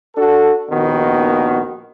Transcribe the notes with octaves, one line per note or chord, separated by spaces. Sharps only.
D4 F#4 A4
A#1 D#2 D#3 B3 F#4